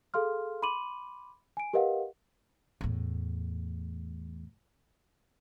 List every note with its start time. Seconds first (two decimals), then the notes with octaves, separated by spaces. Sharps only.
0.14 G#4 A4 F5 C6 F6
0.62 B5 C6 D6 D#7 F#7
1.57 G#5 D7
1.73 G4 A#4 B4 D#5 F5 F#5
2.81 E2 A2